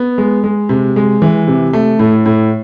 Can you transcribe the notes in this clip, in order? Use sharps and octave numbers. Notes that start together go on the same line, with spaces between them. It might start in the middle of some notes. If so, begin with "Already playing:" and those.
Already playing: B3
G#3
G#3
C3
G#3
E3
C3
A3
A2
A2